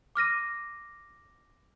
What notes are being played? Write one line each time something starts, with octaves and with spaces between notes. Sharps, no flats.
D6 F6 A#6 D#7